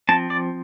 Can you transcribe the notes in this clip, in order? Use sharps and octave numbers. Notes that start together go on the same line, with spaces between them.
F3 C4 A5
D5